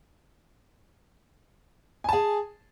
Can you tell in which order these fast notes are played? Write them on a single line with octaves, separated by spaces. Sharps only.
G#5 A5 G#4